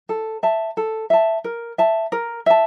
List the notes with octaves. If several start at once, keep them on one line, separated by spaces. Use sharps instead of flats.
A4
E5 A5
A4
E5 A5
A#4
E5 A5
A#4
E5 A5